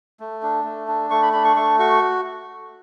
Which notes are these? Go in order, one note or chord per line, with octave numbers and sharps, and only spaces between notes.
A3
D4
A3
D4
A3 C#6
B5
D4 B5
C#6
A3 C#6
F#4 C#6